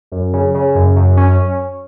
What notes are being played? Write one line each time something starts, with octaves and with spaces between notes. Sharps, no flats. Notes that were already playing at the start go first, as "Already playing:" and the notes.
F#2
C#3
C#3
F#2
F#2
C#4